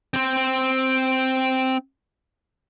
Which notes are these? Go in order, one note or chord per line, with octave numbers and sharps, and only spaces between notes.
C4 C5